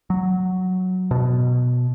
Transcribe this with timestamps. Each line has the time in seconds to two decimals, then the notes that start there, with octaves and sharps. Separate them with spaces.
0.10 F#3
1.11 B2